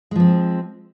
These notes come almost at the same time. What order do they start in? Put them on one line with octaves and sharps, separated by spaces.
G#3 F3 C4